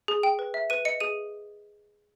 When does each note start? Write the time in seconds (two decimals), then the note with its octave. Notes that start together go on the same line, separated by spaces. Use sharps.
0.08 G#4
0.23 G5
0.39 B4
0.54 E5
0.70 B4 D#7
0.85 D#5 C#7
1.00 G#4 D#7